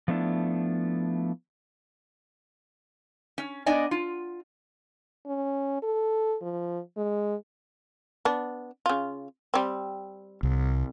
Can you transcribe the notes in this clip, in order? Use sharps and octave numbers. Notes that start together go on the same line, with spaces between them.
F3 A3 B3 D4 E4
C#4
B3 D4 D5 D#5 G#5
F4
C#4
A4
F3
G#3
B3 D4
C#3 F4
G3 C4
C2